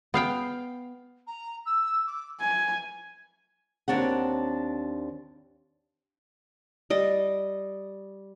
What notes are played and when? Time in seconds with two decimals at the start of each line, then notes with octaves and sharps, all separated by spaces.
0.14 B3 F5 G5
1.27 A#5
1.66 E6
2.07 D6
2.41 G#5 G#6
3.88 D#2 C4 D4 C#5 F#5
6.90 G3 D#5